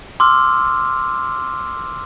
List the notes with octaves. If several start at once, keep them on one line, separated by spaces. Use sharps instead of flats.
C6 D6 E6 F6